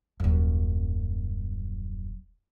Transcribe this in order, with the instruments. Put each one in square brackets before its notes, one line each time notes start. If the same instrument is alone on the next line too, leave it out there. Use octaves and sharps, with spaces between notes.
[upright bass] D#1 F#2